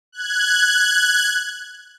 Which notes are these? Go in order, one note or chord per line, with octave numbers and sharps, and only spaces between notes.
F#6 G#6